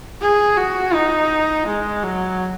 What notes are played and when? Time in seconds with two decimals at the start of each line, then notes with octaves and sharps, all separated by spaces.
0.21 G#4
0.57 F#4
0.93 D#4
1.66 G#3
2.03 F#3